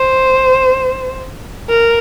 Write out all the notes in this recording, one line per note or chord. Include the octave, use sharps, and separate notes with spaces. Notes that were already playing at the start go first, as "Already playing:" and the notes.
Already playing: C5
A#4